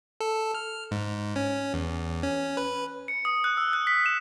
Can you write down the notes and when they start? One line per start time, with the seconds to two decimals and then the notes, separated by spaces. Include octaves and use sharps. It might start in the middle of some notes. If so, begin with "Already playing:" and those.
0.21 A4
0.55 F6
0.91 G#2
1.36 C#4
1.74 E2
2.23 C#4
2.57 B4
3.08 C#7
3.25 D#6
3.44 F#6
3.57 E6
3.73 F#6
3.87 B6
4.06 E7